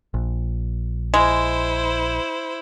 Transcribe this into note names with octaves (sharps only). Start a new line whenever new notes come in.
A#1
G#3 E4 C5